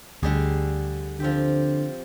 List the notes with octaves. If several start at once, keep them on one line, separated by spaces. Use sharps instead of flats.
D2 D3 G3 G#4
D3 F3 C4 G4